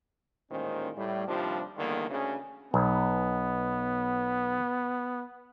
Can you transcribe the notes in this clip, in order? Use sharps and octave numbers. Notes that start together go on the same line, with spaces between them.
A1 A#2 D#3 G#3 C#4 C5
A2 G3
D#2 C3 F3 G3 D4 F4
E2 D3 D#3 G3 A3 A#3
D2 C#3 G#4
B1 B3